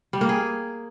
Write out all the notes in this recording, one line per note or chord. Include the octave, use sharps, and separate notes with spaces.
G3
A#3
G#4